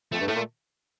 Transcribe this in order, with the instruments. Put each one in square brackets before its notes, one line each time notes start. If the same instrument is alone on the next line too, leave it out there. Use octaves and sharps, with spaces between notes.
[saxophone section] F2 [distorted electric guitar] A3
[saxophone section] G2
[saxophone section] A2 [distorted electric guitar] A3
[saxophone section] A#2